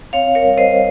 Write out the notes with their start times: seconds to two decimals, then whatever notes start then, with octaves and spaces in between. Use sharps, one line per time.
0.13 C4 C#5 F5
0.35 A#4 C#5
0.42 G3
0.58 C5 D#5
0.72 G3